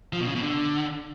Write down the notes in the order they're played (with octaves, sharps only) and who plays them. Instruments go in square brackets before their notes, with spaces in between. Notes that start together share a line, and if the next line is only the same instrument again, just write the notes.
[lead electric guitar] F3
B2
C#3
B2
D3